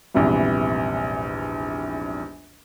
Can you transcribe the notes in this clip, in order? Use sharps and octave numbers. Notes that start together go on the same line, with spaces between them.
A#1 E2 G#2 C3 E3 G3